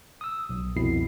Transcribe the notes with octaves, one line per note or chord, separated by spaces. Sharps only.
D#6 E6
B1
C2 F2 B2 E4 C7